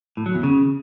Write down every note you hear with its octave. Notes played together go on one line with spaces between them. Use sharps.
A2
F#3
E2
C#3